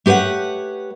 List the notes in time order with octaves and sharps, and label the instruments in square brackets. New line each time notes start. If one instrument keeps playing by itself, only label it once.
[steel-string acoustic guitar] A3 G4 B4 C#5 F#5